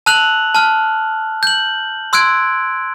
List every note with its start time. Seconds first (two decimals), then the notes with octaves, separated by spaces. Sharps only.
0.06 A5 E6 F#6 F7 F#7
0.55 A5 F6
1.43 G6 F#7
2.13 C6 E6 F#6 G#6 D7